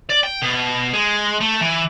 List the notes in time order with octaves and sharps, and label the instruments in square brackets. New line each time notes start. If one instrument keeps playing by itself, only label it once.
[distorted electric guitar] D5
G5
B2
G#3
A3
E3